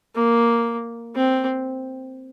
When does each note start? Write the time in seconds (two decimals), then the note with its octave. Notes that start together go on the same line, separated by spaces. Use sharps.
0.15 A#3
1.16 C4